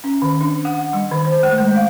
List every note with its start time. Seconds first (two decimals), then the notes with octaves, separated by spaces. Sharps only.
0.04 C#4
0.22 D#3
0.41 D4
0.65 F#5
0.79 F#5
0.93 G3
1.11 D#3
1.25 C5
1.43 A3
1.58 G#3
1.76 F5